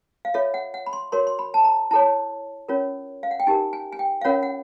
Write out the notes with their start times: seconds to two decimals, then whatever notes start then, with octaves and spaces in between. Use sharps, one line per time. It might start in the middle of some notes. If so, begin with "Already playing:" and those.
0.25 F5
0.34 F4 A4 C#5 E5
0.54 F#5
0.74 F#5
0.86 B5
0.93 C6
1.12 F#4 A#4 C#5 C6
1.27 C6
1.39 B5
1.54 A5
1.64 A#5
1.91 E4 A4 C#5 A5
2.68 C#4 F4 A#4 C#5
3.23 F5
3.31 F#5
3.40 G5
3.47 D#4 G4 A#4 G#5
3.73 G#5
3.92 G#5
3.99 G5
4.21 F5
4.24 C#4 F4 A#4 C#5 F#5
4.43 F#5